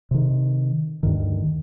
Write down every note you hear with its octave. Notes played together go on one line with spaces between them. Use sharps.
C3 D#3
D2 G2 D#3